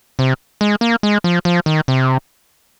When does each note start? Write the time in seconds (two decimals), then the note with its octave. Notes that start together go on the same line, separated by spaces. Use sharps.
0.19 C3
0.61 G#3
0.81 A#3
1.03 G#3
1.24 F3
1.45 F3
1.66 D#3
1.88 C3